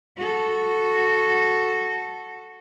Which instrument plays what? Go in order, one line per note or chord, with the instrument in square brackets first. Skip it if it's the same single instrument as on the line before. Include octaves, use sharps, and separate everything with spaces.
[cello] F#4 A4